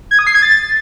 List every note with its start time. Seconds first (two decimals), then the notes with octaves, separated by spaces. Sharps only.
0.11 G#6
0.19 D#6
0.27 C7
0.34 G#6
0.42 A6